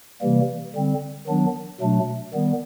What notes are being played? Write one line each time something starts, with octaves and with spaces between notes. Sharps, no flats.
C3 E3 G3 A#3
D3 G3 C4
D#3 F#3 B3 D4
B2 F#3 A3 D4
D#3 G3 B3